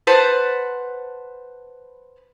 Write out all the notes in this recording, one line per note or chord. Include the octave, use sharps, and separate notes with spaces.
B4 C5 F#5 A5